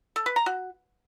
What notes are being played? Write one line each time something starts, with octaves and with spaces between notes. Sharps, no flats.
A4
B4
A#5
F#4